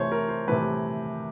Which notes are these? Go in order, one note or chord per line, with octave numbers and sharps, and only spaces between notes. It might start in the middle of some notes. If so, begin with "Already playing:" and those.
Already playing: C3 E3 A3 C5 C#5
A#4
C5
C3 E3 A3 B4